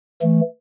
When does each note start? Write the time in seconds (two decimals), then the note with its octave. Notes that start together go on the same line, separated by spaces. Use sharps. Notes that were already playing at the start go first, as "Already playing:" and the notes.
0.22 E3 A3